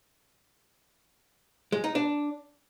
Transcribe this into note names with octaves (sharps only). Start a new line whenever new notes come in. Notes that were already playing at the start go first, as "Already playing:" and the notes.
G#3
D#4
D4